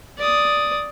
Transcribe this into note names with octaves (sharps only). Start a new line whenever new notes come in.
D5 D#6